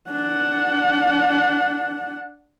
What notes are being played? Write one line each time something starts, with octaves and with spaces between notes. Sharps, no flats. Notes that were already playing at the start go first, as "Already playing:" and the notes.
D4 F#5